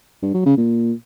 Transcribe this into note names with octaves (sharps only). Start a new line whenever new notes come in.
G2
F#3
C#3
A#2